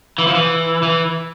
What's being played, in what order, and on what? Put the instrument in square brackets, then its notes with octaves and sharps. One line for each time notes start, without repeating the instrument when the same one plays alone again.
[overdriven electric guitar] E3
F3
E3
E3